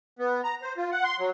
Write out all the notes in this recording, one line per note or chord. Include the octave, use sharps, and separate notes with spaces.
B3
A#5
C5
F4
F#5
C6
F#3